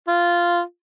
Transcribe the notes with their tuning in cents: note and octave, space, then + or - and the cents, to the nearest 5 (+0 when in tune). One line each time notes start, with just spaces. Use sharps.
F4 -5